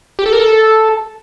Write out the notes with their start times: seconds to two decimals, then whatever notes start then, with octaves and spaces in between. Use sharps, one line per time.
0.19 G4
0.26 A4
0.33 A#4
0.40 A4